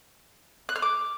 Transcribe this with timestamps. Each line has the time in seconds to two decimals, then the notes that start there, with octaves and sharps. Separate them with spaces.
0.69 F#6
0.76 F6
0.82 D6